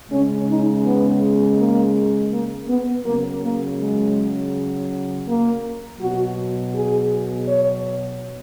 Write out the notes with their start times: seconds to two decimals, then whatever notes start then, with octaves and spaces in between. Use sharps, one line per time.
0.11 C#3 G#3 C#4
0.48 D#4
0.84 B3
1.58 A#3
2.31 A#3
2.69 B3
3.05 C#3 F#3 A#3
3.42 A#3
3.79 G#3
5.27 A#3
6.00 B2 F#3 F#4
6.74 G#4
7.47 C#5